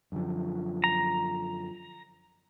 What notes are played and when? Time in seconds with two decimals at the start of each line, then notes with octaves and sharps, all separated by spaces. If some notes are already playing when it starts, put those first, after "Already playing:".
0.12 F#2 D3 F3
0.84 A#5